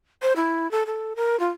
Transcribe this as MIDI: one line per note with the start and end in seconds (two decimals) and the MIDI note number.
0.22 0.33 72
0.36 0.70 64
0.71 0.83 69
0.86 1.14 69
1.16 1.39 70
1.40 1.49 65